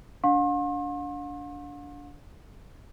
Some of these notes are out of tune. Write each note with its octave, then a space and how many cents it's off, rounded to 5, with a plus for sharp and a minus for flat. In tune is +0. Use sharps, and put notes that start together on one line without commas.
D4 -25 F5 +45 C6 +45